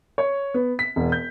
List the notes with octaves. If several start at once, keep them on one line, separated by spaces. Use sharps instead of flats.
C#5
B3
B6
E1
G6